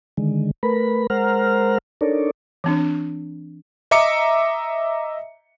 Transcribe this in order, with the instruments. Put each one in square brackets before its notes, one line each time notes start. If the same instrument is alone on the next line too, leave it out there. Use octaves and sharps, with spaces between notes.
[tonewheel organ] D3 D#3 G#3
A3 A#4 B4 B5
G#3 A#4 C5 F#5 A#5 F6
D4 D#4 A4 A#4 C#5 D5
[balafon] E3 C4 D4
[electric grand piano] D#5 E5 A#5 D6 C#7